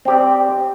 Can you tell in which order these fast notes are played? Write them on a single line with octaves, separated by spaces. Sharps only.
C4 G4 D5